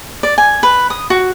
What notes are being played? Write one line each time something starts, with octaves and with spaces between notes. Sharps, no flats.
D5
G#5
B4
D#6
F#4